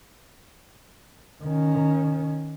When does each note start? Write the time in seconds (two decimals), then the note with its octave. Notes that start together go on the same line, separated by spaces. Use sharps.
1.43 D#3 C#4